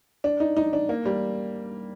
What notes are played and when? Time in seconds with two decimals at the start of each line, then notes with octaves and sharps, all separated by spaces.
0.24 D4
0.40 D#4
0.57 D#4
0.73 D4
0.89 A#3
1.06 G3